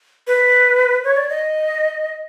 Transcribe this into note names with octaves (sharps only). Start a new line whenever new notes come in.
B4
C#5
D5
D#5